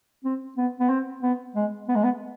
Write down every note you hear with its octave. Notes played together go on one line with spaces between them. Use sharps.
C4
B3
B3
C4
B3
G#3
B3
G#3
B3